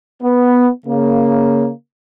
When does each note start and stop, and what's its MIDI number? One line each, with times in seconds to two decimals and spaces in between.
0.22 0.67 59
0.86 1.69 49
0.86 1.69 58